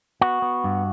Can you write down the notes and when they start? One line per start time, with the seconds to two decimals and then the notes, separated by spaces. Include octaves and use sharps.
0.21 B3 F#4
0.42 B3
0.64 G2